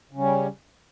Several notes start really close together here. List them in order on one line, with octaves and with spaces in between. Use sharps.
C#3 C#4 G3